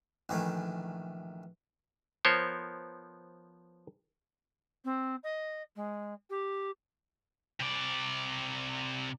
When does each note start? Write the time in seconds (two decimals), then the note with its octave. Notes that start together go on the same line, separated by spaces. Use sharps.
0.29 A#1 D#3 E3 A3
2.25 F3 B3 A#4 C5 C#5
4.85 C4
5.24 D#5
5.76 G#3
6.30 G4
7.60 C3 D5